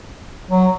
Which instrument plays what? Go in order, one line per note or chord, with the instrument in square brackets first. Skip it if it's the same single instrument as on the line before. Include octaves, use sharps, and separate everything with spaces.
[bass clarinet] F#3